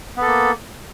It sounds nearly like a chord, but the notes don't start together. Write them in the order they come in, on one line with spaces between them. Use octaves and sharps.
B3 A4 A#3